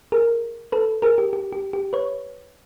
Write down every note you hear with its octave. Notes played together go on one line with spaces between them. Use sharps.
G#4 A#4
A4 B4
G#4 A#4
G4
G4
G4
G4
B4 C#5